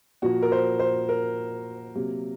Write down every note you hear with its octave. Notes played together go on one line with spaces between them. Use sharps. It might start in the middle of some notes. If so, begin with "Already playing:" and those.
A#2 F3 A#3 F#4
A#4
C5
C5
A#4
C3 F#3 A#3